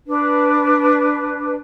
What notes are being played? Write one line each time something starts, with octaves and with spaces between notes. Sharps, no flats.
D4 B4